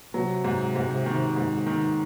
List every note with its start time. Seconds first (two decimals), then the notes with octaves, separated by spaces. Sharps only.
0.14 C3 F#3
0.44 G#2
0.76 G#2
1.06 D#3
1.36 G#2
1.66 D#3